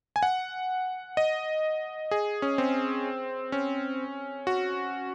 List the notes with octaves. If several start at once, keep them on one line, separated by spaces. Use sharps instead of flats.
G#5
F#5
D#5
G#4
C#4
C4
C#4
F#4